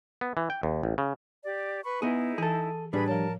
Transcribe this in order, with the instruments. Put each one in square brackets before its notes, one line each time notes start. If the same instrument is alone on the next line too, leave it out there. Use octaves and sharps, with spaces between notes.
[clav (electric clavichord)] B3
E3
G5
D#2
A1
C#3
[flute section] G4 D5
B4 B5 C#6
[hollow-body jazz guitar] B3 G#4 [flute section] D#4 E4
[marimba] E3 [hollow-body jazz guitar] G#4 A4
[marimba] A2 [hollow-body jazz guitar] G3 D4 [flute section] G#4 B4 B5
[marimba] F3 C#5 [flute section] A#4 A5